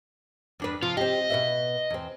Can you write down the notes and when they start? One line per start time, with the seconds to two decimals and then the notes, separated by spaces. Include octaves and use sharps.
0.60 F2 D4 B4
0.82 C3 F3 F4
0.97 C4 G4 D#5
1.30 B2 B4 E5
1.90 E2 C4